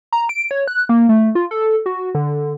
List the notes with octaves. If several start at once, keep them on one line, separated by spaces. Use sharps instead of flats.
A#5
D7
C#5
F#6
A#3
A3
F4
A4
F#4
D3